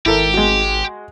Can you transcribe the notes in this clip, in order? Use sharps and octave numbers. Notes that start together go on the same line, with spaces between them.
G#1 E4 G4 A4 A#4
G#3 F#4